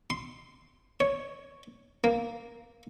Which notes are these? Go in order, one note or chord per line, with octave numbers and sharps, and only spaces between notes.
C6
C#5
A#3